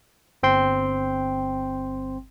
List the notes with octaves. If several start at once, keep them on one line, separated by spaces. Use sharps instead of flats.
G1 C4 G5 C6